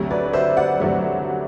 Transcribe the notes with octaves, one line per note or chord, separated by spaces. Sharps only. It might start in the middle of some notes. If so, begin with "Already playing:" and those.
Already playing: D2 C3 F#3 A3
B4 D5
C5 E5
D5 F#5
D2 C3 F#3 A3